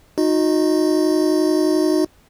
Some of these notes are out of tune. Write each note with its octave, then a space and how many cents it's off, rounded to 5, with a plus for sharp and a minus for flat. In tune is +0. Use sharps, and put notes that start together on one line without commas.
D#4 +0 F#4 -35 D#5 +0